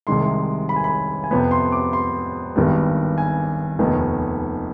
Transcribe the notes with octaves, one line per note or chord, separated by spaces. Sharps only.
C2 C3 D#3 G#3 C6
B5
G#5
B5
G#5
F2 C3 F3 B3 B5
C6
D6
C6
G#1 G2 D#3 G3 B3
G#5
F1 D#2 D#3 B3